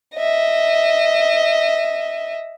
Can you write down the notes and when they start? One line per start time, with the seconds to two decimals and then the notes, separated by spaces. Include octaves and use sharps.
0.15 D#5 E5